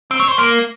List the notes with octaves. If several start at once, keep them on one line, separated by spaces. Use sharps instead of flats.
C4
C#5
C5
A#3